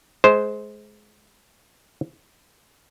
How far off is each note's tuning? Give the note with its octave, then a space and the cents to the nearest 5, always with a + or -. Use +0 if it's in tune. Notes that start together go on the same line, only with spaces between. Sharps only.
G#3 +25 C5 +0